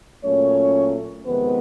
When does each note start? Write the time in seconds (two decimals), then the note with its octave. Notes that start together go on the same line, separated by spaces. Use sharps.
0.23 A#2 F#3 A3 C#4 C#5
1.26 F2 C3 D#3 G#3 B3 B4